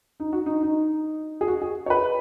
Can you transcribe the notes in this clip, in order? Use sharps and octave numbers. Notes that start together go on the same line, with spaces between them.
D#4
F#4
D#4
D#4
G#4
F#4
G#4
C#5
B4